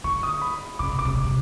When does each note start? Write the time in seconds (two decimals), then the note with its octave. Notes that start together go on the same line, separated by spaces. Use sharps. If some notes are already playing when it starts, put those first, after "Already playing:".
0.04 D3 C#6
0.23 D#6
0.42 B5
0.79 C#3 D6
0.93 C3
0.99 D6
1.05 C3
1.14 B2
1.24 C3